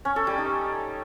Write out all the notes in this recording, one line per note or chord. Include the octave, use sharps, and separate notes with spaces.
C#4
A4
G3
D#4